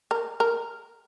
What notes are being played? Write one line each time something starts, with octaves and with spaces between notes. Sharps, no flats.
A#4
A#4